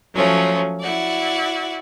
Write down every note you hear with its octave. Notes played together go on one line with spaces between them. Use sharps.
F3 F#3 A3 C#4
E4 F#4 D5